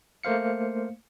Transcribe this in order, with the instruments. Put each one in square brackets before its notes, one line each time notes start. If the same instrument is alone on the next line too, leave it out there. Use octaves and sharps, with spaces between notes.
[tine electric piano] A3 A#3 C5 F5 C#7